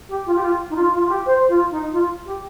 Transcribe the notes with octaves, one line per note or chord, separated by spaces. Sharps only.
G4
F4
G4
F4
D#4
F4
F4
F4
G4
C5
F4
D#4
F4
G4